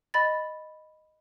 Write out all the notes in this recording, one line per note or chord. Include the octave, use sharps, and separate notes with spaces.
D#5 B5 A6